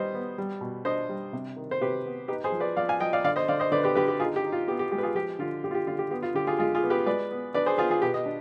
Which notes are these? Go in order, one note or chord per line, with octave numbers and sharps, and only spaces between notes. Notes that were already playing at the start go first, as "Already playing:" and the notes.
Already playing: G3 D#4 B4 C5 D#5
B3
G3
B2
D4 C5 D#5
G3
C3
D#3
C5
C3 G4 B4
B3
D#4 G4 B4
G#4 C5
F3
B4 D5
F3 D5 F5
F5 G#5
F3 D#5 G5
D5 F5
D3 D5 F5
C5 D#5
D3 D5 F5
C5 D#5
D3 B4 D5
G4 B4
D3 G4 B4
G4
D#4 F4 G#4
G4
D#4
F4
B3 G4
G4
G#3 G4
B4
F4 G#4
F3 G4
D3 F4
D3 G4
F4
G4
D3 F4
G4
B3 G4
F4
D3 G4
F4 G#4
G#3 F4 G#4
F4 G#4
B3
G4 B4
G#3 B4 D5
B3
D4 B4 D5
G#4 C5
B3 F4 G#4
F4 G#4
B2 G4 B4
D#5
D4